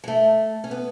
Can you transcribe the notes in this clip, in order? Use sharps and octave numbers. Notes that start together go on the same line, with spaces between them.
G#3
A3
C#4
B3